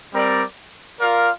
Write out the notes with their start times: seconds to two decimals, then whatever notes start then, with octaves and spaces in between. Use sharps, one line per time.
0.12 G3 C4 A#4 D5
0.99 F4 A#4 D5 F5